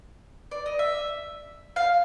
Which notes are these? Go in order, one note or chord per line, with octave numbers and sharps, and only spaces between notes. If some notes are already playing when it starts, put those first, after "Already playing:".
D5
D#5
E5
F5